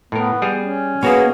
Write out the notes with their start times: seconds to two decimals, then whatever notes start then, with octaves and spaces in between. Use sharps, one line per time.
0.12 A2 B3 A#4
0.42 G3 G#4
0.60 C#4
1.03 A#3 B3 F#4 G#4 C#5